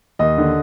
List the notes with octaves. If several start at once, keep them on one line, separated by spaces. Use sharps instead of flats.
D#2 D#5
D3